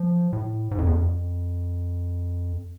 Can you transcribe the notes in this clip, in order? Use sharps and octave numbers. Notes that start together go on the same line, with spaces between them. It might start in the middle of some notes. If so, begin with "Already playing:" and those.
Already playing: F3
A2
G#2
F2
E2
F2